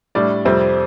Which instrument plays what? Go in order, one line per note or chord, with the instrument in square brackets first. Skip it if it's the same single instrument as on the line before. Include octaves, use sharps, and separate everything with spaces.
[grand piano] A2 G3 D4 D5
F2 C3 G3 C4